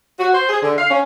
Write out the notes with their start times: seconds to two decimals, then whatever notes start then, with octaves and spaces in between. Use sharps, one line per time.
0.19 F#4
0.33 C5
0.49 G#4
0.62 D3
0.77 F5
0.90 C#4